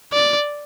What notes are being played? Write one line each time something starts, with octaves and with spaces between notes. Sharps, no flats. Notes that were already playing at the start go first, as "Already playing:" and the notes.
D5